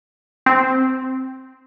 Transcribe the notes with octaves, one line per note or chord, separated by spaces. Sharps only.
C4